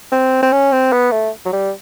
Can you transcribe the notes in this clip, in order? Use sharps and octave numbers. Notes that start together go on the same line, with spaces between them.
C4
C4
C#4
C4
B3
A3
F#3
G3